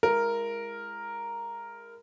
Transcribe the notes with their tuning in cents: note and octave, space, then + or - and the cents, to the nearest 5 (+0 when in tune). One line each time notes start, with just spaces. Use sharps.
G#3 -10 E4 +35 A#4 +0